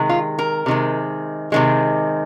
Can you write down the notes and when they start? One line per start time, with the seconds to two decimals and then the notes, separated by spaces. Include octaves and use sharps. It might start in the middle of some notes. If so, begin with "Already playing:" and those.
Already playing: C3 D#3 G#3
0.09 F4
0.39 A#4
0.66 C3 D#3 G#3
1.52 C3 D#3 G#3